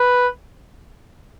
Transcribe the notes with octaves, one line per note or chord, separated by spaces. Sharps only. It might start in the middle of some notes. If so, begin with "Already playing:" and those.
Already playing: B4